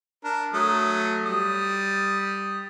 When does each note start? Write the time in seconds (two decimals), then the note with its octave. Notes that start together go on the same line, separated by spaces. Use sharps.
0.24 D4 A#4
0.54 F#3 A3 D#6
1.26 G3 D#6